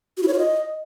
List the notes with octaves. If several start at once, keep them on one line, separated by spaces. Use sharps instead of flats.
F#4
E4
C#5
F4
D#5